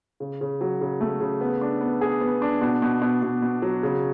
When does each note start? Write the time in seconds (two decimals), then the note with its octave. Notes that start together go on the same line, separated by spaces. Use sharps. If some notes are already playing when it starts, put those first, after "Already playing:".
0.20 C#3
0.41 C#3
0.61 F#3
0.81 C#3
1.01 A3
1.21 C#3
1.41 B3
1.61 D4
1.81 B3
2.01 G#4
2.21 B3
2.42 D4
2.61 B2
2.82 B2
3.02 B2
3.23 B2
3.42 B2
3.62 F#3
3.83 C#3